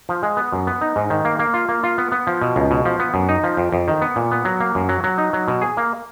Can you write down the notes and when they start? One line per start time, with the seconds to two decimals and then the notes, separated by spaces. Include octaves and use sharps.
0.09 F3
0.23 G#3
0.37 B3
0.52 F#2
0.67 B3
0.81 D#4
0.96 G#2
1.10 D#3
1.25 A#3
1.39 A#3
1.54 F4
1.69 A#3
1.83 F4
1.98 B3
2.12 B3
2.27 F3
2.41 B2
2.56 C#2
2.71 B2
2.86 F3
2.99 B3
3.14 F#2
3.29 D#4
3.44 F3
3.57 F2
3.73 F2
3.88 D#3
4.02 B3
4.16 A#2
4.31 B3
4.45 F#3
4.60 A#3
4.75 F#2
4.89 F#3
5.04 F#3
5.18 D#4
5.33 F#3
5.48 B2
5.62 G#4
5.77 A#3